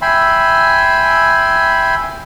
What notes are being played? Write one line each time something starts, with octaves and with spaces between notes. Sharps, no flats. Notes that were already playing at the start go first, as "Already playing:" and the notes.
E5 G5 G#5 B5 C6